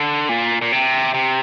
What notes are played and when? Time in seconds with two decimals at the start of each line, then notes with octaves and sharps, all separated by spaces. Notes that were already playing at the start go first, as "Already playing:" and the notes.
Already playing: D3
0.29 A#2
0.62 A#2
0.72 C3
1.14 C3